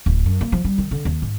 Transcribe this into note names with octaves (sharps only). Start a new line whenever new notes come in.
D1
F#2
A#3
F3
G3
D#3
D3
D#2
G#2